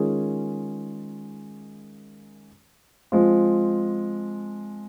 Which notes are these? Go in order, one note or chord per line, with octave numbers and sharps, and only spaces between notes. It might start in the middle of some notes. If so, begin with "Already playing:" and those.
Already playing: D#3 G#3 C#4 F4 G#4
F3 G#3 C4 F4